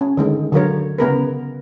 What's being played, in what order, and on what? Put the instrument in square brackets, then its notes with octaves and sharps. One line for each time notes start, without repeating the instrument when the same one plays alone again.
[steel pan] C#4
D3 D#3 G#3
D3 F#3 A#4 C#5
C#3 B3 A#4 B4